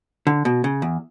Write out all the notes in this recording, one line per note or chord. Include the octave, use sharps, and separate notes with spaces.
D3
B2
C#3
E2